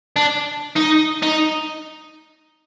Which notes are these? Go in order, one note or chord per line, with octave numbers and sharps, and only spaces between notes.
D4
D#4
D#4